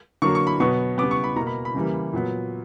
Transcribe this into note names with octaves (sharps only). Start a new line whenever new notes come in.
D3 F#3 A#3 C#6
C#6
B5
B2 F#3 B3 C#6
C#3 G3 B3 D6
C#6
B5
B2 A#3 A#5
B5
B5
C#3 E3 G3 A#3
A#2 F#3 B3